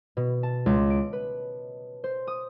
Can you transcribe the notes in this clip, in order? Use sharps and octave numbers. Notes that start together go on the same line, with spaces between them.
B2
A5
C#2
D7
B4
C5
D#6